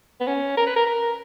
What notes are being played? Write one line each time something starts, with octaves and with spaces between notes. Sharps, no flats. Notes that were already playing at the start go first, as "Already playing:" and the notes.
B3
C#4
A#4
B4
A#4
A#4